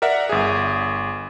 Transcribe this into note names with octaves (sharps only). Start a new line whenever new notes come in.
A#4 D5 E5 F#5
G1 G#4